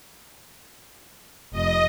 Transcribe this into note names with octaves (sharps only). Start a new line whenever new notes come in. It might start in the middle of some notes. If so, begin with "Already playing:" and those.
F1 D#5